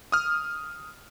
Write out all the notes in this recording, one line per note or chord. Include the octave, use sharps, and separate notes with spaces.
D#6 F6